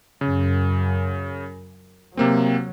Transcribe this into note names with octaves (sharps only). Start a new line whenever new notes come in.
F#2 C#3
C3 F#3 A#3 C4